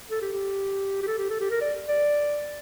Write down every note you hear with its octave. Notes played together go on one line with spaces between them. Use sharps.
A4
G4
G4
G4
A4
G4
A4
G4
A#4
D5
D5